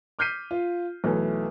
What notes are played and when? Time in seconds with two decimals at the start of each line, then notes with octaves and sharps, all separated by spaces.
0.19 D6 F6 G6 B6 C7 D#7
0.51 F4
1.04 B1 E3 A3